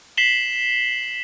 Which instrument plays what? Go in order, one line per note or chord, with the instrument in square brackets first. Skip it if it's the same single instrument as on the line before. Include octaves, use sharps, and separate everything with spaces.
[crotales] B6 C7 E7 F#7 G7